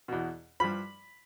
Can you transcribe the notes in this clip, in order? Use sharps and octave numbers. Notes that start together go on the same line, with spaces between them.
E2 B2
G2 F3 B5